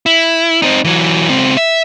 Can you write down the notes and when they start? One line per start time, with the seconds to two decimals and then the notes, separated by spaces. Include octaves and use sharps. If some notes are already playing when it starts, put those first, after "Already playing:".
0.06 E4
0.62 C4 D#4
0.84 E3 F#3
1.29 C#2 C4
1.57 E5